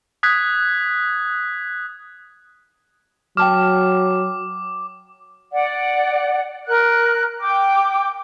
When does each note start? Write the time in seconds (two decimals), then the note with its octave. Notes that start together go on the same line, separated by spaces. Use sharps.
0.23 D#6 F#6 G#6 B6
3.37 F#3 G5 A5 D6 F6
5.52 D5 F#5
6.67 A#4 F#6
7.40 G5 D6